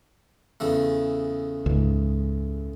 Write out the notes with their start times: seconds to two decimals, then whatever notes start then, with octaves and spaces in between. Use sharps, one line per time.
0.60 E2 C#3 A3
1.66 C#2 G#2